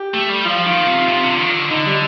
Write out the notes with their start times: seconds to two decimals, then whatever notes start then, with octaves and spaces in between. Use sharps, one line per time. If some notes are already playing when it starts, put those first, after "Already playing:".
Already playing: G4
0.14 A3
0.29 G3
0.45 F3 F4
0.67 D#3
0.87 C3
1.08 C3
1.24 D3
1.39 D#3
1.54 D3
1.70 D3 D#4
1.86 G3